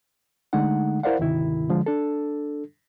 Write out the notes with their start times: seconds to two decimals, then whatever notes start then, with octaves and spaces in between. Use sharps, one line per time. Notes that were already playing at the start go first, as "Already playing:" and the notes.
0.53 D3 G#3 A3 D#4 F#5
1.03 E4 A#4 C5 D5 F5 F#5
1.19 D2 G#2 C3 D#3 E4
1.70 D3 F3 G#3
1.86 D4 A4